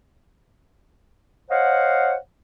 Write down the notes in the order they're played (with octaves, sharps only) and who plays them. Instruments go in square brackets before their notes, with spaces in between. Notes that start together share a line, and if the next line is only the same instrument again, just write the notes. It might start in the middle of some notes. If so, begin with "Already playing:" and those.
[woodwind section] C5 C#5 D#5 F5 F#5